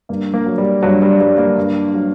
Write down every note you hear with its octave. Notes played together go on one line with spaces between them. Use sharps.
G2 A#3
A#3
F#3
G3
G2 F#3
G3
F#3 G3
A#3
G2
F#3